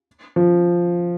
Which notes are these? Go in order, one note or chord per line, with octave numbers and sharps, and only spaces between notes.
F3